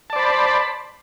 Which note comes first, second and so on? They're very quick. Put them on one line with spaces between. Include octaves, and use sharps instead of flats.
A5 D5 C5 B5